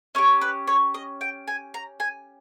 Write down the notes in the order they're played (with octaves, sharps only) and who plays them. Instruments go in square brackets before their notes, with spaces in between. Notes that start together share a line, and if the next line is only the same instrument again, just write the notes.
[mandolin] C#4 G4 C#5
B4
C#5
D#5
G5
G#5
A#5
G#5